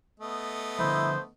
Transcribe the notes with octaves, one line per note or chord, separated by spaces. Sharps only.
A3 B3 D#5
D3 F3 G3 E4 C5